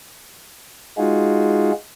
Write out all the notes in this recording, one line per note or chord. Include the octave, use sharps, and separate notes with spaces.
G#3 D#4 F4 F#4 G#4